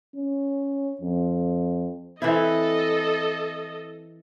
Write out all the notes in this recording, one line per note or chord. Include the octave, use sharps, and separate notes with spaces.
C#4
F2
E3 C4 E4 A4 D#5